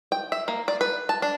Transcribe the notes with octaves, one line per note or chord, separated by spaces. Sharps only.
G5
E5
A#3
D5
B4
A5
D4